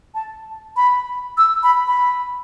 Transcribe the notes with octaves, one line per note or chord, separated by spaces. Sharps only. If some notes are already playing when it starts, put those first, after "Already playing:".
A5
B5
E6
B5
B5